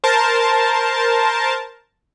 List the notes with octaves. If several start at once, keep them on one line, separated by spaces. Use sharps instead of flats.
A#4 C5 A5